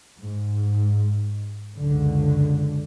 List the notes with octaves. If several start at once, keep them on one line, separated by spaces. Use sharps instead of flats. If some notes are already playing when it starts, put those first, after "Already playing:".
G#2
C#2 F#2 D3